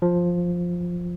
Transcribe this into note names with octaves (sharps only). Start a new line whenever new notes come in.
F3